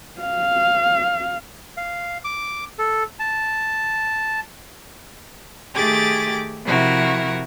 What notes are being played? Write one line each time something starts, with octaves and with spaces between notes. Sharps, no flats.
F5
F5
D6
A4
A5
D#3 A3 G4 G#4 D6 A6
C3 F3 E4 F#4 A#4